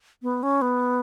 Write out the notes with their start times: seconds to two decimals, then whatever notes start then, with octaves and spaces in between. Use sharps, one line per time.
0.22 B3
0.43 C#4
0.62 B3